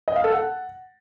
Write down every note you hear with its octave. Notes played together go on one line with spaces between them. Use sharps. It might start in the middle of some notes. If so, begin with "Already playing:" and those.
D#5
F5
A4
F#5